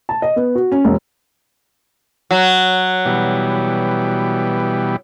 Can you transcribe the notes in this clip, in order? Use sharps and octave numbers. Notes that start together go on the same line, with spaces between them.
A5
D#5
B3
F#4
C#4
E1
F#3
B2 E3 G3